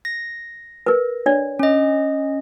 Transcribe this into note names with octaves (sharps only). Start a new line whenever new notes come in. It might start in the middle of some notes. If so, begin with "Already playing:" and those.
A#6
A#4 B4
D4 C#5 D5
C#4 D#5